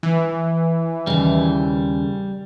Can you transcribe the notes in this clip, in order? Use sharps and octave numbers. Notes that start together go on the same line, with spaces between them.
E3
D#2 C#3 G3